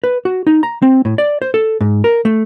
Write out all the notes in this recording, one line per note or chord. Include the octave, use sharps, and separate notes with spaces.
B4
F#4
D#4
A#5
C4
A2
D5
C5
A4
G#2
A#4
A3